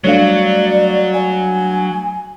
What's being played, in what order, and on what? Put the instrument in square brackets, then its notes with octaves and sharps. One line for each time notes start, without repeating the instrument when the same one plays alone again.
[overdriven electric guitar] F#3 [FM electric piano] G3 A3 D4 [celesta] C#5 F5 [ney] D5
[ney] G#5